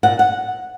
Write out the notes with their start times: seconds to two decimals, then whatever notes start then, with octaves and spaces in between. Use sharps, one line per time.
0.03 A#2 F#5
0.19 F#5